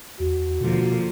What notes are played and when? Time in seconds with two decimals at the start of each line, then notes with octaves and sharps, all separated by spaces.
0.20 E2 F#4
0.61 B2 D3 F3 A#3